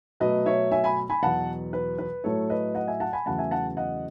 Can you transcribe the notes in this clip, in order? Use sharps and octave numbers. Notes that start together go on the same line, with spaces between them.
B2 F#3 A3 B4 D#5
C#5 E5
E5 G#5
G#5 B5
G#5 B5
E2 B2 F#3 F#5 A5
B4
B4
A2 F#3 A3 A4 C#5
B4 D#5
D#5 F#5
E5 G#5
F#5 A5
G#5 B5
E2 C#3 F#3 A3 F#5 A5
E5 G#5
F#5 A5
D#5 F#5